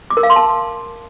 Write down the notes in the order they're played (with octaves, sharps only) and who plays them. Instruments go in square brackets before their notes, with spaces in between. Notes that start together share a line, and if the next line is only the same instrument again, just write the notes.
[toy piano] D6
A#4
F5
C6
A5